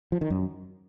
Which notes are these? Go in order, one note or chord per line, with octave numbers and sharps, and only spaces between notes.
F3
D#3
F#2